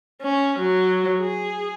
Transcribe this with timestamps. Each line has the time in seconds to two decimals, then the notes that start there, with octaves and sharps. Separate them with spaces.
0.22 C#4
0.59 F#3
1.20 G#4